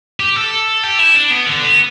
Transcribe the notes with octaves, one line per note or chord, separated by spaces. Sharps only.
G4
A4
G4
E4
D4
B3
D3
B3